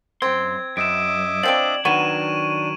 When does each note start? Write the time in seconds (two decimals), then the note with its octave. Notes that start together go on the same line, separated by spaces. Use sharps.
0.22 F#2 C4 C6 G#6
0.77 F#2 D#5 E5 D6 D7 E7
1.43 F3 C4 D4 D5 F#7
1.85 D#3 F#3 B3 D4 C#6 D#7 E7